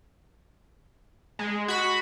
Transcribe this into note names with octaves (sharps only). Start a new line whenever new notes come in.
G#3
F#4 B5